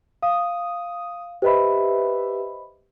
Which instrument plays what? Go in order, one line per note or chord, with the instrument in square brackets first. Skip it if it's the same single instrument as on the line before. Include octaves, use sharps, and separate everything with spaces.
[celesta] F5 [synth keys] D#6
[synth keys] G4 B4 E5 [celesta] C5 D#5 B5